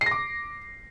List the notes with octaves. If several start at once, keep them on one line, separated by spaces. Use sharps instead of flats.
C7
A#6
D6